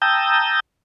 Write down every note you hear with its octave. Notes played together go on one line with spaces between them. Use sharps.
G5 A5 A#5 D#6 E6 G6